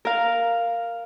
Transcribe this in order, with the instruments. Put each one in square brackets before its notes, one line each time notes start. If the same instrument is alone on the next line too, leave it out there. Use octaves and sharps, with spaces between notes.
[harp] A#4 F5